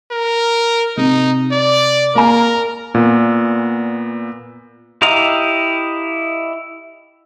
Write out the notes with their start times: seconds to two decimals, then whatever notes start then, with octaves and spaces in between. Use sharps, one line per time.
0.11 A#4
0.97 C3 D#4
1.52 D5
2.15 A#3 A#4 A#5
2.95 A#2 B3
5.02 E4 G4 D#5 F5 A#5